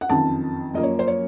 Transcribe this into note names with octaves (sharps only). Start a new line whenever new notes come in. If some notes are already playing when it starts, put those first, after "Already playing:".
F#5
F#1 F2 D#3 A5
F#2 F3 A#3 D#5
C#5
C5
C#5